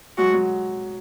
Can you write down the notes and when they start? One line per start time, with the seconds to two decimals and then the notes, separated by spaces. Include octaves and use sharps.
0.18 F#3 G#3 F#4
0.33 F#3 G#3